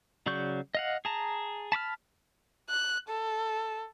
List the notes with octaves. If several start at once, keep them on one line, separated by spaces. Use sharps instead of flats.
C#3 F#3 D5 C#6 G6
D#5 F5 F#5
G#4 A5 A#5
A5 B5 D6 F6
F#6
A4